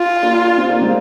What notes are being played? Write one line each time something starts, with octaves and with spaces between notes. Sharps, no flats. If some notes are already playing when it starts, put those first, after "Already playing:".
Already playing: F4
A#3 D4
C4 D#4
A#3 D4
G#3 C4